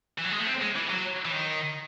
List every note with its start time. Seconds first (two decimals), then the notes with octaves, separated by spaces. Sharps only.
0.18 E3
0.25 F#3
0.32 G#3
0.39 A3
0.47 C4
0.61 G#3
0.75 E3
0.90 F#3
1.25 E3
1.32 D#3